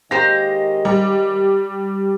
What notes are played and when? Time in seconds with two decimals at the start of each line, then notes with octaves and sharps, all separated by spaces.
0.11 D#3 G#3 A#3 G4 C5 D#5 A#6
0.85 G3